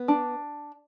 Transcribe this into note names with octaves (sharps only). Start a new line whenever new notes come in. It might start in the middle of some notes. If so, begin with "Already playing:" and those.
Already playing: B3
D4